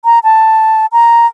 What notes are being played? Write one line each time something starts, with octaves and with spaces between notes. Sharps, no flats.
A#5
A5
A#5